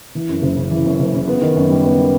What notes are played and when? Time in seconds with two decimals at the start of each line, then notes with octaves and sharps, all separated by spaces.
0.15 E3
0.29 F#2
0.42 F#1
0.57 C#3
0.71 E3
0.86 F#2
1.00 F#1
1.14 C#3
1.28 B3
1.42 D#3
1.56 F#2
1.70 G3
1.84 B3
1.98 D#3